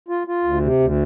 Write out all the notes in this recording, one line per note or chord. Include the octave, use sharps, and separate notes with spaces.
F4
F4
D2
C3
D2